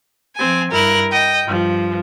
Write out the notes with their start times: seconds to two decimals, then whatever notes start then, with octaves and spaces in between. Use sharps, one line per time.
0.37 F3 C4 G#5
0.73 G2 E4 A#4 F#6
1.11 D#5 G5
1.46 G2 F3